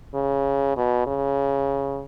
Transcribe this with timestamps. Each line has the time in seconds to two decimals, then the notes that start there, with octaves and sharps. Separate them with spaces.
0.14 C#3
0.77 B2
1.07 C#3